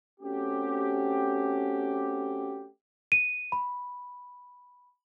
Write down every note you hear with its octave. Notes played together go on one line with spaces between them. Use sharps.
A3 C4 C#4 F#4 G4
D#7
B5